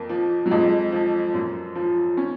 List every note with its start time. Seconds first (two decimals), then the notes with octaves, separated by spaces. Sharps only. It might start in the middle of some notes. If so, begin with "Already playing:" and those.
Already playing: F2 A#3
0.09 F3
0.46 F#3
0.51 F2 G#3
0.92 F3
1.34 F#2
1.75 F3
2.17 C#4